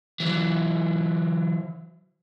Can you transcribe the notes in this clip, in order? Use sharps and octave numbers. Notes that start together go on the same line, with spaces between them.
E3 F#3